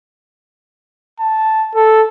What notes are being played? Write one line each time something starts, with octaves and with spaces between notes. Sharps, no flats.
A5
A4